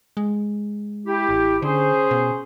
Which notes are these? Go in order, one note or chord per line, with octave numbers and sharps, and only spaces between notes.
G#3
E4 G4
A1
D3 C#4 G#4 C5
B2